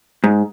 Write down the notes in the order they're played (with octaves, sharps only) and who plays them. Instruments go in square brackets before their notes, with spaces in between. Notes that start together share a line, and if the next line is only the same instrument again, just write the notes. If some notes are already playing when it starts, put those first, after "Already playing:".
[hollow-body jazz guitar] G#2